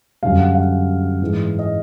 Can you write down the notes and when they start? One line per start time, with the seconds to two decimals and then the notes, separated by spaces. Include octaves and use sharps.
0.23 F#2 D3 G3 F5
0.39 F#5
0.55 F5
1.22 G#2 E3 G#3
1.59 D#5